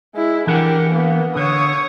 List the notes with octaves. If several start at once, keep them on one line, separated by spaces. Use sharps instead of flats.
G#3 E4
E3 D4 G4 A#4 F#5
A#3 B3
D3 C#5 D#6